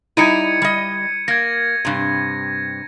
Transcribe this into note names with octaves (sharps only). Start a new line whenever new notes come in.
G3 D#4 E4 G#6 C#7 D#7
G3 D#5
A#3 G#6 A#6
G2 C3